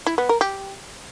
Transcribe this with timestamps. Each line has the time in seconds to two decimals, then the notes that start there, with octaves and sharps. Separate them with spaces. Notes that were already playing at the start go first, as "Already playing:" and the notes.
0.06 E4
0.18 B3
0.29 A#4
0.41 G4